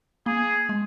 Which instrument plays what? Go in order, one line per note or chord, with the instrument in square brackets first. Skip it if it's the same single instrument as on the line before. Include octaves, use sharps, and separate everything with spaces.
[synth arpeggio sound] A#3 [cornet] G#4
[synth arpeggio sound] G#3